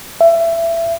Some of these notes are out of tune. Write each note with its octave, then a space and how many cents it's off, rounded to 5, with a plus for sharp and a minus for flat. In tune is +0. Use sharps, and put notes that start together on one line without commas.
E5 +20